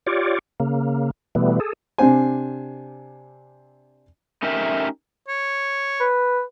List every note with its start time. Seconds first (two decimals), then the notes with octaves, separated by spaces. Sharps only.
0.06 F4 G4 C#5 D5
0.60 C#3 A#3
1.35 B2 E3 G3 A3 B3
1.60 G#4 A4
1.98 C3 C4 D4 C5 G#5
4.42 A3 C#4 D#4 G4 A#4 E5
5.29 C#5
6.00 B4